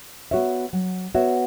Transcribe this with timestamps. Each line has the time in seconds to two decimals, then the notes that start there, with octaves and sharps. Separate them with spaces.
0.31 B3 F#4 C#5 E5
0.73 F#3
1.15 B3 F#4 C#5 E5